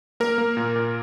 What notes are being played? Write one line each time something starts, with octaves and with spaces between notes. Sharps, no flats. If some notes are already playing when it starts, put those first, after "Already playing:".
A#3 A#4
A#3
A#2
A#2